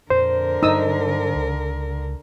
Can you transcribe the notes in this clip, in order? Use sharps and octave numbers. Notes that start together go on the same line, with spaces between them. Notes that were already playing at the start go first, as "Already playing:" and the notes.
F2 A#2 D3 A#4 C5
G2 F#3 D#4 D#6 E6
C#2